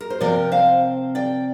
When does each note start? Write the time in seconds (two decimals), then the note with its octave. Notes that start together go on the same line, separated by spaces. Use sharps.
0.01 A#4
0.10 C5
0.21 C3 F3 C4 A#4 D5
0.52 C5 F5
1.15 D5 G5